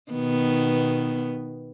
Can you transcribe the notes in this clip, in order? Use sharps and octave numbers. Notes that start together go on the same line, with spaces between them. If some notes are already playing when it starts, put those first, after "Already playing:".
B2 D#3 B3